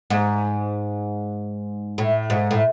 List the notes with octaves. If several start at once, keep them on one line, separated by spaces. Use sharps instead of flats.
G#2
A2
G#2
A2